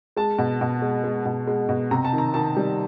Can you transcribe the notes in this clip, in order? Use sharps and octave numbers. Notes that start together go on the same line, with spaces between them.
G#3 A5
B2
B2
G#3
G#3
B2
G#3
B2
C3 A#5
A5
D#3
A#5
D#3 A5
G3